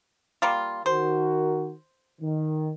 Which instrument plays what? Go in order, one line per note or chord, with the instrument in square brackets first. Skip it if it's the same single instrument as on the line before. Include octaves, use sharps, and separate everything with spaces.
[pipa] G3 A#3 F4
[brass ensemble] D#3 F#4 A#4 [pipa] C5
[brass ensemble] D#3